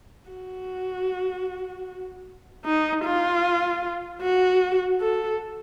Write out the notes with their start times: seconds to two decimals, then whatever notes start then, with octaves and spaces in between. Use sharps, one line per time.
0.30 F#4
2.65 D#4
3.05 F4
4.22 F#4
5.01 A4